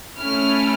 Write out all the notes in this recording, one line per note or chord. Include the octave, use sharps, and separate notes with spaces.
A3 C#4 E4 F6